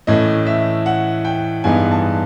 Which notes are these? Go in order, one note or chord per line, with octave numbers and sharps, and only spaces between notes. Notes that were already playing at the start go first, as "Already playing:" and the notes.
A2 E3 A3 C#4 D#5
E5
F#5
G5
G2 E3 G#3 B3 D#4 G#5
A5